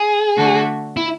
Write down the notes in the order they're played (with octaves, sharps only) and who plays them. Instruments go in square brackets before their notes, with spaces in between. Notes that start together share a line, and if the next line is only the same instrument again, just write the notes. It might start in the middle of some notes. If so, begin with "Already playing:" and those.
Already playing: [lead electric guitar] G#4
[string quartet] D3 A3 D4 F#4 A4
[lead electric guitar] E4